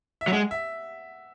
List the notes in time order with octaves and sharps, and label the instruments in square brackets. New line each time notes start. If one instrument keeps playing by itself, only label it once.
[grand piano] E5
[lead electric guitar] F#3
[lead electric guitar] G#3 [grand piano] F#5
[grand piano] E5